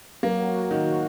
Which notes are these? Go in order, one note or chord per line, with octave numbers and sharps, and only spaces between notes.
F#3 A#3
F#4
F#3
D#3 F#4
F#4